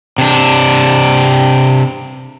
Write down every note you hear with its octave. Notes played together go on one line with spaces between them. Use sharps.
C3 D4